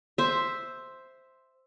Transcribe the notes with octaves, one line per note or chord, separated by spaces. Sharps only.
C5 E5